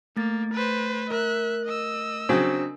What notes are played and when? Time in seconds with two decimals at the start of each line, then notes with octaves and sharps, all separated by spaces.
0.17 A3 A#3 A6
0.54 B4 C5
1.10 A#4 E5 F#6
1.66 D#5 E6
2.29 C#3 F#3 C4 D4 D#6